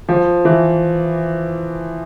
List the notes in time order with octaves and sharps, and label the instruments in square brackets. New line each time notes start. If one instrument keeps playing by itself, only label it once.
[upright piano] F3
E3